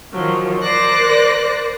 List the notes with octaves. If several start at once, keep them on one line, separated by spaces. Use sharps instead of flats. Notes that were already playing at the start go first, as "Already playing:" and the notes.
D#3 F3 F#3
A#4 C5 D5 D6 F#6 A#6